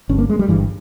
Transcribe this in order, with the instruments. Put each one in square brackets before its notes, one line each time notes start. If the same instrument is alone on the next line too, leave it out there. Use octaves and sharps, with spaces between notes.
[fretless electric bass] G1 G2 C#4
A#3
G#3
G3
G1 G2 E3